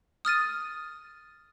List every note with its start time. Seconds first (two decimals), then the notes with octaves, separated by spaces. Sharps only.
0.25 D#6 F6 A6 D#7